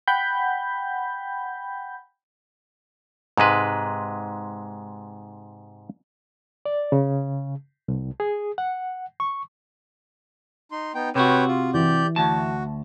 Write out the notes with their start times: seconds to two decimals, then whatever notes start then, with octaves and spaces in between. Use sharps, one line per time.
0.07 F#5 G5 B5 G6
3.38 G#2 C3 G#3 B4
6.66 D5
6.92 C#3
7.88 C2
8.20 G#4
8.58 F#5
9.20 C#6
10.71 D#4 C6
10.95 B3 D#4 G5
11.15 C3 F#4 B4 C#5 G5
11.48 F4
11.74 E3 G4 D5 G6
12.16 D2 F#4 A5